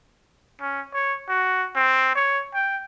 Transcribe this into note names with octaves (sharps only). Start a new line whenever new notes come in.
C#4
C#5
F#4
C4
C#5
G5